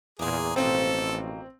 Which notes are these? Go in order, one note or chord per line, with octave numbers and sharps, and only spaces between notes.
E2 A#2 A#3 G#4
A1 B2 F3 A#3 C4 A4